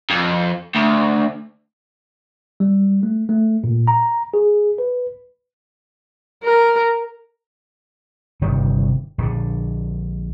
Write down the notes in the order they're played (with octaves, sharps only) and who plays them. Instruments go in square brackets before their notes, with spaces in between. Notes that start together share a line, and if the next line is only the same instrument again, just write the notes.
[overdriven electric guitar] F2
D2
[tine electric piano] G3
A3
A3
A#2
A#5
G#4
B4
[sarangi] A#4
[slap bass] G1 C3 D#3 G3
A#1 D3